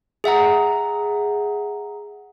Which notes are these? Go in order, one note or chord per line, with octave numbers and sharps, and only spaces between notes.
G#4 E5 F#5 A#5